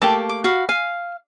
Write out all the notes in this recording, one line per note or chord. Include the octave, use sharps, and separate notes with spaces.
A3 A#3 G4 A5
D6
F#4 F5 B5
F5 G#5